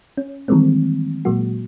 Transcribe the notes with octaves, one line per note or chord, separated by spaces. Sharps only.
C#4
D#3 E3 G3 G#3 A#3 C4
A#2 F#3 G#3 A#3 F#4